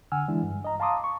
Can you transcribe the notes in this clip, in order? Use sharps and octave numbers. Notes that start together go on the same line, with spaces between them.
D3 F#5 G#5 E6 F6
E3 G#3 D4 E4
G2
D#5 A#5
F5 A5 A#5 C6 D6 D#6
C#6